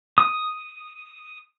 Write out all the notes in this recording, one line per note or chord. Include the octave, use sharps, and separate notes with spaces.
D#6